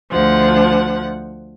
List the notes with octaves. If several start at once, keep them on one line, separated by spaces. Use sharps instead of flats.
D2 F3 F#5